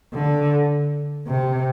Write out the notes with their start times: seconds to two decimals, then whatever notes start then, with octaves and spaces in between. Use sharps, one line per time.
0.13 D3
1.27 C3